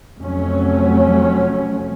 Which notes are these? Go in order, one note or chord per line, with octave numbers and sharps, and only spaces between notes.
F2 C3 F#3 A3 C#4